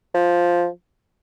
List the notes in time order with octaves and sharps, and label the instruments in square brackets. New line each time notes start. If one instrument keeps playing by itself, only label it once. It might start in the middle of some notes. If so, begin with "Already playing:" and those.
[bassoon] F3